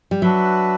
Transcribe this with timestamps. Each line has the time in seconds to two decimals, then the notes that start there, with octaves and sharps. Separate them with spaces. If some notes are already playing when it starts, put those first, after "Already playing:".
0.11 G3
0.22 F#3 D4 F#4 B4 E5